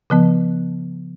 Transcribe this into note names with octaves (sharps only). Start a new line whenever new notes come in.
C#3 F3 B3